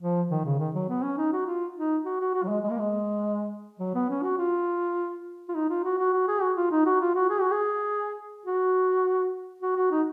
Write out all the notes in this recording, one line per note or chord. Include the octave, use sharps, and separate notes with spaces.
F3
D#3
C#3
D#3
F#3
B3
C#4
D#4
F#4
F4
D#4
F#4
F#4
F#4
F#3
G#3
G#3
A#3
G#3
F#3
B3
C#4
F#4
F4
F4
D#4
F4
F#4
F#4
F#4
G#4
F#4
F4
D#4
F#4
F4
F#4
G#4
F#4
G#4
F#4
F#4
F#4
D#4